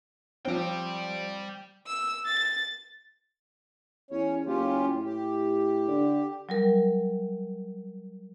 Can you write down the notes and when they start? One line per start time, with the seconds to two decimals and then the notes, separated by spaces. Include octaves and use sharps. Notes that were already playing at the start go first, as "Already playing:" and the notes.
0.45 F3 C4 D5 G5
1.87 E6
2.25 A6
4.11 E2 C#4 C#5
4.46 F#1 C#4 F4 G4
4.85 A2
5.03 G4
5.88 D3
6.49 F#3 G3 A#4